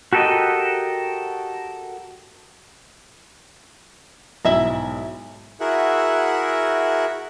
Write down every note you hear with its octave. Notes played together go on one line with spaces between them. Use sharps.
F#4 G4 A4 A#4 D#5
B1 G#2 E4 E5 A#5
E4 F#4 G#4 A#4 E5 F#5